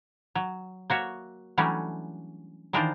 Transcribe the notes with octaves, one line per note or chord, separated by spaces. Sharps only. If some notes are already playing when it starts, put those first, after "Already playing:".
F#3
A#3 F#4 C#5 E5
E3 F#3 G3 A3 C#4 D4
D#3 E3 D4 F4 A#4 C5